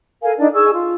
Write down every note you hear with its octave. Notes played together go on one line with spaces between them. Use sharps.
A4 A#4 F5 G#5
D4 D#4 D5
G#4 C#6 E6
F4